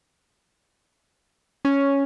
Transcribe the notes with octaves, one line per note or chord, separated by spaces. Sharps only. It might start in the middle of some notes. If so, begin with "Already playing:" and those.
C#4